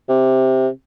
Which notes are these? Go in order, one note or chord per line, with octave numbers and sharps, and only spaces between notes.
C3